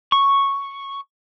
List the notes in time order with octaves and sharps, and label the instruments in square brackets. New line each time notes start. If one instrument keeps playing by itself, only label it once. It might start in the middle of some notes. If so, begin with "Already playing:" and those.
[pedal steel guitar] C#6